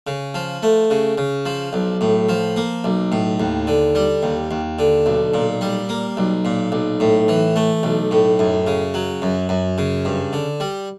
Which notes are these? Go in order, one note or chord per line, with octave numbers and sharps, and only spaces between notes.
C#3
F3
A3
C#3
C#3
F3
B1
A2
F3
A#3
B1
A2
D#2
D3
G3
D#2
D#2
D3
B1
A#2
G3
A#3
B1
A#2
B1
A2
E3
A3
B1
A2
F#2
C#3
F#3
F#2
F#2
C#3
G2
D3
G3